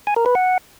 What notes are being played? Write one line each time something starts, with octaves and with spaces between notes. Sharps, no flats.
G#5
A#4
B4
F#5